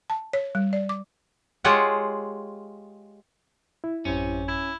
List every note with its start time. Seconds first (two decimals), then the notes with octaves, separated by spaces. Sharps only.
0.10 A5
0.33 C#5
0.55 G3
0.73 D5
0.89 D6
1.64 G#3 F4 G4 C#5 F#5
3.84 E4
4.05 A1 F#2 C3 C#4
4.48 E4